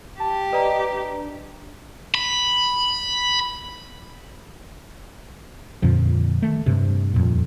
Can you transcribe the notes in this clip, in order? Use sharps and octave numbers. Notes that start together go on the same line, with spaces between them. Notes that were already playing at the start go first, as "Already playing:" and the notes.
G4 A5
B4 D5 D#5 A#5
D4
B5
F2 A#2 D3 F3
D#3 A3
G2 C3
D#1 F2 A#2